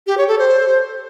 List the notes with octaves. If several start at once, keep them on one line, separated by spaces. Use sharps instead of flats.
G4
C#5
A4
C5